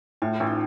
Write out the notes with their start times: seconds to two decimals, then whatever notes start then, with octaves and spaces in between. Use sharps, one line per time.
0.22 A2 F4
0.40 A1
0.47 D#4